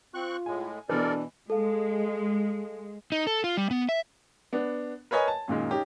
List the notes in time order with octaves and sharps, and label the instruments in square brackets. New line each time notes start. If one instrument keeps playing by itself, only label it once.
[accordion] C4 C#6 F#6 [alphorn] F4
[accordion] A2 G#3 [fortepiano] G#5
[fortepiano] B2 E3 [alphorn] D4 [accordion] A4 A#4 D5
[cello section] G#3 [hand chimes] A4 F5
[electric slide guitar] D#4
A4
F4
G3
B3
E5
[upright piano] B3 D4
A#4 B4 C#5 D#5 G#5
A5
F#2 A#2 D#3 G#3
C#4 D#4 G4